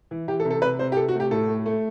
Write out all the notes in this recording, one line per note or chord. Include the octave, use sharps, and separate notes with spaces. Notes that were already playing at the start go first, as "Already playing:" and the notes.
E3
E3 G4
A4
C3
A4
C3 B4
C3 C5
G4
C3 A4
F#4
A3
G4
A2 A4
A3
A3